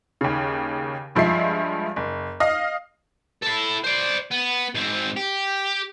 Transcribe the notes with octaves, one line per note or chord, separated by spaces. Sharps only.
D#2 C#3
G2 F3 G#3 E5 C7
F#1
D#5 F5
E4 A4
C5 D5
B3
G#2 C4
G4